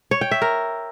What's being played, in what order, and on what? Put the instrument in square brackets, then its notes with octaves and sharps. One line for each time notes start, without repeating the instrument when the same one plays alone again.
[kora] C#5
G5
E5
A#4